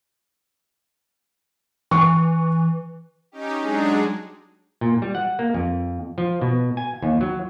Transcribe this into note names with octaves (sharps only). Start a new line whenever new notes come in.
E3 C#6
C#4 D#4 G4
F#3 G#3 D4 D#4 G#4
A#2
G3
F#5
A#3
F2
F3
B2
G#5
D#2
F#3